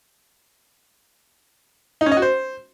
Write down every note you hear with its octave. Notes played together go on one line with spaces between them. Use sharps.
D#4
C#4
D#5
F#4
C5